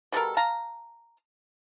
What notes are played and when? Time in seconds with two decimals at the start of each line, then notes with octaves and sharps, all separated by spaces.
0.12 B2 G3 A4 A#4
0.37 F5 A5 A#5